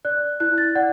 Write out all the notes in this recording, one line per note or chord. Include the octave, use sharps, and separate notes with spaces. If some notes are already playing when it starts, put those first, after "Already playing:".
D5 F#6
E4 F#6
A6
D5 F#5